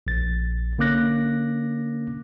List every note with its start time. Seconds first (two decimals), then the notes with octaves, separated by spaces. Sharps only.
0.07 A#1 A6
0.79 D3 A#3 C#4 D6 F#6 A#6